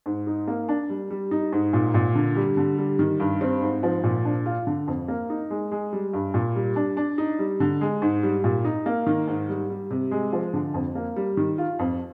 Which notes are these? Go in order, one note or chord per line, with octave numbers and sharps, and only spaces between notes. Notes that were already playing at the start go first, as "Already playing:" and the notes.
G#2
D#4
A#3
D4
G3
G3
D#4
G#2
A#2
A#2
D3
G3
D3
G3
D#3
G2
C4
G#2
F3
A#2
D4
F4
D3
F2
A#3
D#4
G#3
G#3
G3
G2
A#2
G3
D4
D4
D#4
G3
D3
G#3
G#2
G3
A#2
D#4
A#3
D#3
G#2
G3
G3
C3
G#3
F3
D3
F2
A#3
G3
D#3
F4
F2